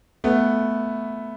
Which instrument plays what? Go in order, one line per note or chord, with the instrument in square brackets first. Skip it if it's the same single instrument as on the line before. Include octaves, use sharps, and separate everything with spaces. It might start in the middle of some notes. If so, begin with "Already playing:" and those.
[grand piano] A3 B3